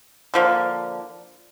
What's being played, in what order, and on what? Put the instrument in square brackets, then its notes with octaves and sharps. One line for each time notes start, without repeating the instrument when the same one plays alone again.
[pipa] D3 F3 A#3